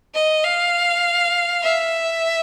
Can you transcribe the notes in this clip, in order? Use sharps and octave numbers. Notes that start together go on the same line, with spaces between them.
D#5
F5
E5